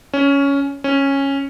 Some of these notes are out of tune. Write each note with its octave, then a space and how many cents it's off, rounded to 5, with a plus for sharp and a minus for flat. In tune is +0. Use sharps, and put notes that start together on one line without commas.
C#4 +10
C#4 -10